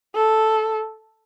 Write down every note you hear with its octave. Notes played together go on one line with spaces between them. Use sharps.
A4